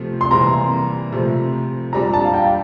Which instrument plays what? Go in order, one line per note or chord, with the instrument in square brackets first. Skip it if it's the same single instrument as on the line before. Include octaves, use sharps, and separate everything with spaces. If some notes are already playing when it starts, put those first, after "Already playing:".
Already playing: [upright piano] C3 F3 A3
[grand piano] C6
[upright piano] C3 E3 G3 A#3 [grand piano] A#5
[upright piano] C3 F3 A3
[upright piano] A#2 G3 D4 [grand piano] A#5
[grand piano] A5
F5
G5